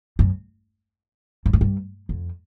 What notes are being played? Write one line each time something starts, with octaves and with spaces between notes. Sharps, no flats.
F#2
G2
G#2
G2
F2